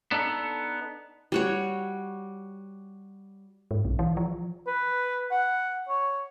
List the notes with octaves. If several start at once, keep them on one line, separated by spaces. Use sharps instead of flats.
B3 D4 D#4 A4
G3 F#4 C#5
G#2
B1
E3
F3
B4
F#5
C#5